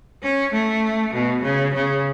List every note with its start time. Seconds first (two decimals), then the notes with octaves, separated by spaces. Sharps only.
0.23 C#4
0.53 A3
1.13 B2
1.44 C#3
1.74 C#3